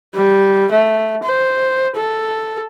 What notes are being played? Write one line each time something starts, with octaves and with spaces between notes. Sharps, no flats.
G3
A3
C5
A4